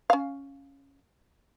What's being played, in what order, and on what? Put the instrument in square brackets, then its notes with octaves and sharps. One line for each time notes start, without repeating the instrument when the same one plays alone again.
[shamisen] C#4 F5